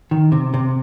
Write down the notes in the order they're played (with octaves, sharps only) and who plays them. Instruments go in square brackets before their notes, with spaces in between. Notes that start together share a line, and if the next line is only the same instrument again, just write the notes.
[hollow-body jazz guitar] D#3
C3
C3